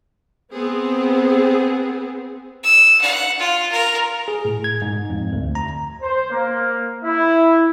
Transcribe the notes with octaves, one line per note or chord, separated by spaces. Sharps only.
B3 C4 G#4
E6
F#5
F4
A#4
G#4
A2
G#6
G#2
F2
D2
A#5
C5
A#3
E4